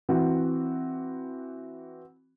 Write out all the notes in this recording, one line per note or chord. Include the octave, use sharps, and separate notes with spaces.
E3 C4 F#4